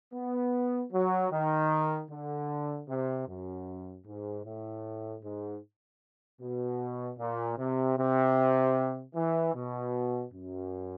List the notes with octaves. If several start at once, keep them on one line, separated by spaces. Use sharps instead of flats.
B3
F#3
D#3
D3
C3
F#2
G#2
A2
G#2
B2
A#2
C3
C3
E3
B2
F#2